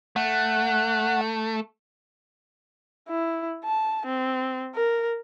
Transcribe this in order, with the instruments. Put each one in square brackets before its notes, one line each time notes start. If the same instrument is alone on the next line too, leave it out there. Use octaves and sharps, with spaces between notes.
[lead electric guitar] A3 [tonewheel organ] F#5
[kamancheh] E4
A5
C4
A#4